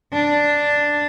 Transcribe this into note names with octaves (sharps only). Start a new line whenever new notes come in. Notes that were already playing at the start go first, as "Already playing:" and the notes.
D4